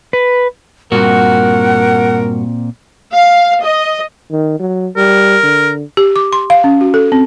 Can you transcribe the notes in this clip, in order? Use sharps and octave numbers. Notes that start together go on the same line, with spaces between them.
B4
G2 A#2 A#3 C4 F#4 A#4 F#5
F5
D#5
D#3
F#3
G3 A#4
D3
G4
D6
C6
F5
C#4
F#4
A4
C4